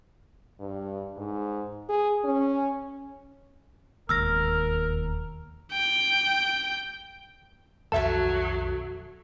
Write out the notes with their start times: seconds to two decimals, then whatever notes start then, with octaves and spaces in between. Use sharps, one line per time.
0.60 G2
1.17 G#2
1.89 G#4
2.24 C#4
4.09 E1 D#2 A#4 E6 F6 A#6
5.72 G5
7.92 B1 F2 D#3 F#3 A4 E5 A5